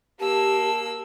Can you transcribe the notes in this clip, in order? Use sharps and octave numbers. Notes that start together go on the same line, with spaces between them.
A#3 G4 A5 E6